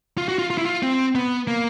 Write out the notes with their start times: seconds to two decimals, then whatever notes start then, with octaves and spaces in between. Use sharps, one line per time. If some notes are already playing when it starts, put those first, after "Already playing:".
0.18 F4
0.28 F#4
0.39 F4
0.50 F4
0.58 E4
0.65 F4
0.83 C4
1.15 B3
1.47 A#3